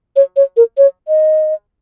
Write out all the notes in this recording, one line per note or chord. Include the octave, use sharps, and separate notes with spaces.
C#5
C#5
A#4
C#5
D#5